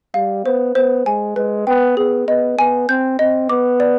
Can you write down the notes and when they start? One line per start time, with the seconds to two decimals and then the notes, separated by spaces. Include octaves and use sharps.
0.14 G3 F5
0.45 B3 C5
0.75 B3 C5
1.06 G#3 G#5
1.36 G#3 B4
1.67 B3 G5
1.97 B3 G#4
2.28 B3 D#5
2.58 B3 G#5
2.89 C4 G6
3.19 C4 D#5
3.49 B3 D6
3.80 D5